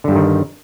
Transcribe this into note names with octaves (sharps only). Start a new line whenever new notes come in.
G2 D3 D#3 G3